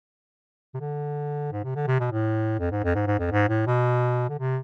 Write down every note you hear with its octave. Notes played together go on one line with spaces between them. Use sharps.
C3
D3
G#2
C3
D3
C3
B2
A2
F2
G#2
F2
G#2
G#2
F2
G#2
A2
B2
D3
C3